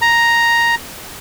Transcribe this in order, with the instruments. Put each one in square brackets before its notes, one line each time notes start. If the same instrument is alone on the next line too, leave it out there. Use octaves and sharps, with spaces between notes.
[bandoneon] A#5